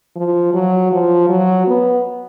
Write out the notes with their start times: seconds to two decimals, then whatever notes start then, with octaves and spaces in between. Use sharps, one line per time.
0.16 F3
0.54 F#3
0.92 F3
1.29 F#3
1.67 B3